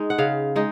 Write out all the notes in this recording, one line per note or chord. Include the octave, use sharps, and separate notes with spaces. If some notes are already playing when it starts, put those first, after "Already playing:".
Already playing: G#3 D#4
F#5
C#3 F5
G#3 D#4